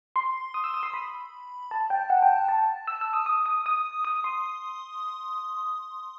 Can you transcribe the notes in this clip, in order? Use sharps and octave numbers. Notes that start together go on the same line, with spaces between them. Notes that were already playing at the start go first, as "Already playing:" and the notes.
C6
D#6
E6
D#6
C6
B5
A5
G5
F#5
G5
A5
E6
E6
D#6
D#6
D#6
D#6
D#6
C6